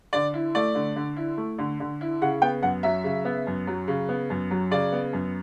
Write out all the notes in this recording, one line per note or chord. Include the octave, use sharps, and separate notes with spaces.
D3 D5
E4
A3 D5
D3
D3
E4
A3
D3
D3
E4
C#3 F#5
B3 G5
F#2 F#5
F#3 E5
C#3
B3
F#2
F#3
C#3
B3
F#2
F#3
C#3 D5
B3
F#2